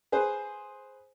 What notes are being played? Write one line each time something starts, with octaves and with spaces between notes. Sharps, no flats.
G#4 B4 C5